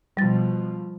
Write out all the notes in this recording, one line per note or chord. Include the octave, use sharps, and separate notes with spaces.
B2 F3 G3 A6